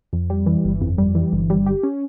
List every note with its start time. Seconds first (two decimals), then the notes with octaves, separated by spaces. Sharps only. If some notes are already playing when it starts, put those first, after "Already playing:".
0.13 F2
0.30 G3
0.46 E3
0.64 G1
0.81 F2
0.98 G3
1.15 E3
1.32 G1
1.50 G3
1.66 G4
1.83 C#4